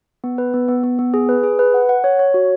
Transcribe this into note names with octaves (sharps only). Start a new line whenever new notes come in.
B3
B4
B3
B3
B3
B3
G#4
B4
G#4
B4
F#5
F#5
C#5
C#5
F#4